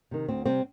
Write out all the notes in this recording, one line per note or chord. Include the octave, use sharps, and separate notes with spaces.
C3 D#3
D2 C4
C3 G3 C4